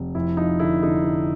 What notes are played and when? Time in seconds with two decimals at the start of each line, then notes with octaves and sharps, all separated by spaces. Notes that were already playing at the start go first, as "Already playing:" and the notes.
Already playing: F1
0.15 F2 E4
0.37 F3 D#4
0.59 D3 E4
0.83 D3 D#4
1.05 D3